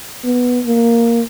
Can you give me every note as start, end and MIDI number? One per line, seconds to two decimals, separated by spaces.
0.24 0.60 59
0.66 1.22 58